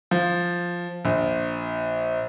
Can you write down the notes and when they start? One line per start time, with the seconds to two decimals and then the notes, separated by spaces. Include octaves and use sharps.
0.11 F3
1.05 A#1